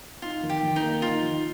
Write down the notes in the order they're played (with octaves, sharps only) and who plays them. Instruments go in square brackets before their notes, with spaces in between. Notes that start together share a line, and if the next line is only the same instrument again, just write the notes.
[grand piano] D#4 [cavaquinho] F4
[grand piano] D#3
[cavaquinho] G4
[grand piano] D#3
[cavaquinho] D#4
[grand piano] A#3
[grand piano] D#4 [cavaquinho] F4
[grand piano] D#3